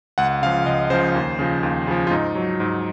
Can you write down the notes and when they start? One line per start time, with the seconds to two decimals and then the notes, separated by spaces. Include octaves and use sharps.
0.18 C#2 F#5
0.42 C#3 F5
0.46 F3
0.66 C#2 D#5
0.90 C#3 F3 C5
1.15 D#2
1.39 C#3 F3
1.63 D#2
1.87 C#3 F3
2.07 F4
2.11 G#2 D#4
2.35 F#3
2.60 G#2